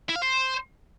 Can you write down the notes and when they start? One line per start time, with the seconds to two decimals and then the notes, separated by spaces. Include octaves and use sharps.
0.09 E4
0.16 F5
0.22 C5